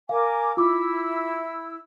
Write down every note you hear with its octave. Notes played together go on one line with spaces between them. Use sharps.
A#4 F5 G#5 D6
E4 F4 D6 E6